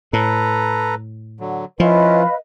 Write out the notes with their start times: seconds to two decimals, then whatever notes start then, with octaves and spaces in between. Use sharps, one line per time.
0.13 A2 A4 B4 A#5
1.40 D3 F#3
1.80 F3 C#4 E4 F4 B4 D#5 F5